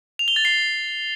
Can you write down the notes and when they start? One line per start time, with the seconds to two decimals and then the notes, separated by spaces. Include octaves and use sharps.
0.19 F7
0.28 G7
0.36 A6
0.45 C7